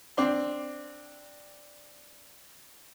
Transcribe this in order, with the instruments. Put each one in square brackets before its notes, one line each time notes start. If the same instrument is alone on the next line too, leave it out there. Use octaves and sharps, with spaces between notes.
[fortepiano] C4 D4 C6